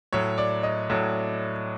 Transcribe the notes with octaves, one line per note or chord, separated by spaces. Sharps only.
A2 F#3 C#5
D5
D#5
A2 F#3